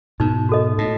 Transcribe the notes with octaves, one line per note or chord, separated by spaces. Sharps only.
G#2 B2 D#4
F#4 A4 D#5
A2 D#4